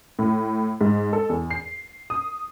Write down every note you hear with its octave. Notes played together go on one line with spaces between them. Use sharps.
A2
G#2
A4
E2
C7
D#6